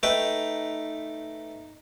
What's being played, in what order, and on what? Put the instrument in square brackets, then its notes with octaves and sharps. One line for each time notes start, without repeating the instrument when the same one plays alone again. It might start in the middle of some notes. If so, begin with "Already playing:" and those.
[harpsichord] A3 B4 G5 [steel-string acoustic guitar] D#4